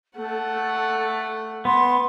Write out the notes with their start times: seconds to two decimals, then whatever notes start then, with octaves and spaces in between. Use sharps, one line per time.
0.17 A3 A4 F#5
1.65 B3 C6